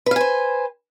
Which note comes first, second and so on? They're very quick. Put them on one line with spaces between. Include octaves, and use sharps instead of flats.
B4 F5 G#5 C5